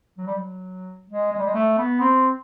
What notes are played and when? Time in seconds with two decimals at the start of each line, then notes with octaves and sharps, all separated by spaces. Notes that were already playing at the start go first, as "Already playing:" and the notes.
0.18 F#3
0.27 G3
0.35 F#3
1.09 G#3
1.32 G#3
1.39 G3
1.46 G#3
1.55 A3
1.78 B3
2.00 C4